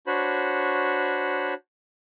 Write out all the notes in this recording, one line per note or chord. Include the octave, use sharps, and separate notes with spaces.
D4 F#4 C5 C#5 B5